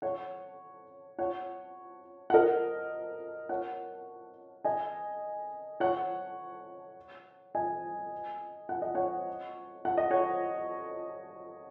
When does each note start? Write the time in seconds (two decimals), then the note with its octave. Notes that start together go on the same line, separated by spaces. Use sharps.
0.02 C#5 F#5
1.19 C#5 F#5
2.30 F#5
2.34 A#4 D#5
3.49 C#5 F#5
4.64 D#5 G#5
5.80 C#5 F#5
7.55 D#5 G#5
8.69 F#5
8.82 D#5
8.95 C#5 F#5
9.85 F#5
9.98 D#5
10.11 C#5 F#5